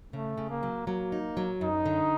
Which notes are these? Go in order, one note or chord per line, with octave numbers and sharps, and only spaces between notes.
C#3 A3
C#3
A#3
F#3
F#3 A#3
D#4
F#3
F#2 D#4
D3